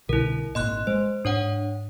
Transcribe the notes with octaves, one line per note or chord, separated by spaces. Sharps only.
C2 B2 D3 E4 A#4
G#1 A#2 D#5 C6 F#6
G#3 C5
G#2 D4 C#5 F#5